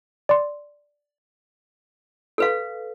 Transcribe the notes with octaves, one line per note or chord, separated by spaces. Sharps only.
D5 C6
A4 B4 F5